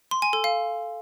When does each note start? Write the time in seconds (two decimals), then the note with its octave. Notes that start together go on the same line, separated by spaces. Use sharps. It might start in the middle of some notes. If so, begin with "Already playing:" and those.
0.11 C6
0.22 G#5
0.33 A4
0.44 F5